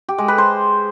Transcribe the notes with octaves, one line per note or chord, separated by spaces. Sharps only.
G4
G#3
B4
C5